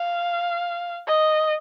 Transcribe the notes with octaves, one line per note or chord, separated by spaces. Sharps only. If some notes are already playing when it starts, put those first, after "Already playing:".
Already playing: F5
D#5